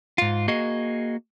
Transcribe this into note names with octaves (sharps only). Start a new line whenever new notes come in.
G#2 F4
A#3 F#4 G#4 D#5